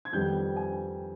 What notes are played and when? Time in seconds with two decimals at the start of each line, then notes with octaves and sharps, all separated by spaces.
0.05 G#6
0.13 F2 D#3 G3 B3 G6
0.57 G#5